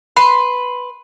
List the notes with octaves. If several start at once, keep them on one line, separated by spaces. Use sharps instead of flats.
B4 B5 C6